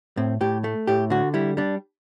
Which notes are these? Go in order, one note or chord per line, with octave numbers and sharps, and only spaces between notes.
A2 C4
A2 G4
A3
A2 G4
D3 F#4
G3 E4
G3 D4